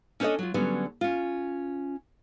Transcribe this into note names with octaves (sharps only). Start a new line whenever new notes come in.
C#4 D4 A4 C5 C#5 D#5
F#3 F4
D3 F#3 G3 B3 C#4
C#4 F4